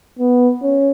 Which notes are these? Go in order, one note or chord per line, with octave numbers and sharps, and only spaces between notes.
B3
C#4